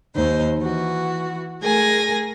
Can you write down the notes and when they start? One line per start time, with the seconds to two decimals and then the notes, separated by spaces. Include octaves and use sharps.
0.15 D#2 D#4 C5
0.57 E3 F#4
1.62 A3 G#4 A#4 G#5 A#6